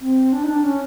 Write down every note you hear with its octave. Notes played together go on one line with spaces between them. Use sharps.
C4
D4
D#4
D4
C#4